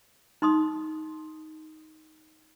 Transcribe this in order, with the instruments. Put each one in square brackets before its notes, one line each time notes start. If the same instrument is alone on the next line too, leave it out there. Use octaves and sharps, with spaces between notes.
[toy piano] D#4 C6 D#6